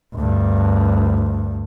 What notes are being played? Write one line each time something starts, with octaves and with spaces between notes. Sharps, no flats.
D2 G2